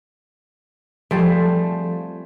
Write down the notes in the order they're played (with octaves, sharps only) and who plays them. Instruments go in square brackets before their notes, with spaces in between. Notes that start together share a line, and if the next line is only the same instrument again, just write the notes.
[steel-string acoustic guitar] F3 G#4 A5 [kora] G3 A3 C4